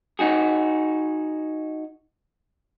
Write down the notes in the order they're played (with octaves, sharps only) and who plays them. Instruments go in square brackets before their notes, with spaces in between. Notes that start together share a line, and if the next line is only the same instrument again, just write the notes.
[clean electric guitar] D#4 F#4 G#4